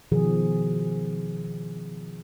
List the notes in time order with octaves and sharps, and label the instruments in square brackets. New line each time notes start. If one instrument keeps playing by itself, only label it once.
[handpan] B2 D#3 F3 G#4